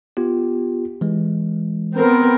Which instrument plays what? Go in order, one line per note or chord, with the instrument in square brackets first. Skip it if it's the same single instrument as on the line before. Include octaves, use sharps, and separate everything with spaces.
[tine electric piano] B3 F4 G4
E3 G#3
[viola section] B3 C4 A#4